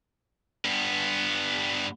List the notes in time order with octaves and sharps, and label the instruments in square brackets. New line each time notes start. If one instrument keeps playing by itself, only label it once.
[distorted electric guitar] G2 B3